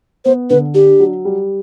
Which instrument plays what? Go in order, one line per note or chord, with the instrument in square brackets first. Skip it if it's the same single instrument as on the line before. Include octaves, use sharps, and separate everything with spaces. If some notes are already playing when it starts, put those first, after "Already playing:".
[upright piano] B3 [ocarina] C5
[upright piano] D3 [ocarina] B4
[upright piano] D4 [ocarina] G4
[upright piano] F#3
G3